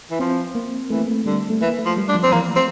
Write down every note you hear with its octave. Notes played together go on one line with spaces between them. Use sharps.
E3
F3 C4
A#3
E3 A3
A#3
A3
D3 G3
A3
E3 A#3
A3
F3
G3
D4
F3
C4
E3 A#3
C4